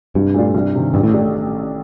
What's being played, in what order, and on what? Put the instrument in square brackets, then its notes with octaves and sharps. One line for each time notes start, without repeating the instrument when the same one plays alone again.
[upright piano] C2 [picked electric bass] G2
[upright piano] A#2 A3 D4 F4
C2
C3 D#3
[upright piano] A1 [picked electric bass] G2
[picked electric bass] A2
[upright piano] A3 D4 G4